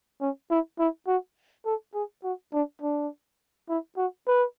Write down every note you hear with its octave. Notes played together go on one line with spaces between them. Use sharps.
C#4
E4
E4
F#4
A4
G#4
F#4
D4
D4
E4
F#4
B4